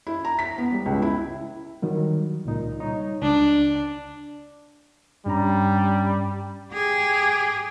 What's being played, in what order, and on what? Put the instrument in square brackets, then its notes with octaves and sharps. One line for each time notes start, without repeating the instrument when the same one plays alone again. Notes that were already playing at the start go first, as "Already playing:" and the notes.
[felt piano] E4
A#5
B6
B3
G3
C#2
E4
[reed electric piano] D#3 F#3 G3
C#2 A#2 D#4
G3 D#4 C#5
[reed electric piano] C#2 [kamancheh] D4
[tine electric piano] G2 C#4 A#5 [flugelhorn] G3
[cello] G4 G#4